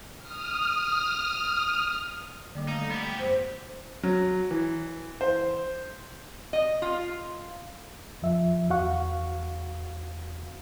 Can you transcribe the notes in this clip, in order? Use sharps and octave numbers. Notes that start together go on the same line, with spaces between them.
D#6 F6
D3 G3 A#3 D5
A3 D#4
G3 B3 G4 C#7
F#2 B2 C5
F#3
E3
C5
D#5
F4
F2 F3 E5
E2 F#4 F5 F#5 C#6